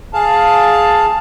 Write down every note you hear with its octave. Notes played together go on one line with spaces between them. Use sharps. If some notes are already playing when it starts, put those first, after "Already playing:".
G#4 F5 A5